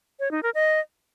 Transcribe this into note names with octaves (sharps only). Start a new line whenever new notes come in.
C#5
D#4
A#4
D#5